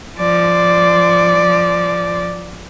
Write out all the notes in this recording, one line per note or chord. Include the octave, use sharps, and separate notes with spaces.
F3 D5